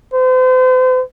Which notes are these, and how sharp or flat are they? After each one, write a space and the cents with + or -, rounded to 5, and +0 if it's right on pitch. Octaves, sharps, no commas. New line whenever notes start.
C5 -40